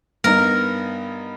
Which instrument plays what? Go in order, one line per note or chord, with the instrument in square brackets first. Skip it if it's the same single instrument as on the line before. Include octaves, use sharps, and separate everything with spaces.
[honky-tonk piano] G2 B3 D#4 [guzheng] A#4